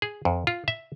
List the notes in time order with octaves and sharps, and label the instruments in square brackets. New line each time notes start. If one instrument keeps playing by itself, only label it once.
[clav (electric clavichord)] G#4
F2
F4
E5